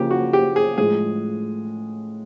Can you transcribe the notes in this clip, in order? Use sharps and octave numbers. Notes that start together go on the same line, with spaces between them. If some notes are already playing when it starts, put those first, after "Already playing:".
Already playing: C#3 F3 A#3 G4
F#4
G4
G#4
A2 F3 G#3 G#4